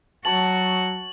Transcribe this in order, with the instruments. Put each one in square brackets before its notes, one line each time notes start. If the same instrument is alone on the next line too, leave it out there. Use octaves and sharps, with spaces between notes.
[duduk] F#3 [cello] F#4 [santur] C#5 A5 [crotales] F#7